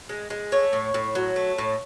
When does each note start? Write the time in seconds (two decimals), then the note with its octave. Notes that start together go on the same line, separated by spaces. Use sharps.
0.09 G#3
0.30 G#3
0.52 A3 C#5
0.73 A2
0.94 A2
1.15 F#3
1.36 A3
1.58 A2